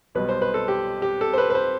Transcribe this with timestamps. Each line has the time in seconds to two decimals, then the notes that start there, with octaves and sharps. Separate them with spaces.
0.15 B1 B2 G3 B4
0.29 C5
0.42 B4
0.54 A4
0.68 G4
1.02 G4
1.21 A4
1.33 C5
1.38 B4
1.50 B4
1.55 C5